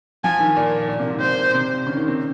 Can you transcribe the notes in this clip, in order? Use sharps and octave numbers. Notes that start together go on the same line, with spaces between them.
F3 G#5
D#3
A#2
A#2
C3
G#2
A#2 C5
C3
C#3
D#3
C4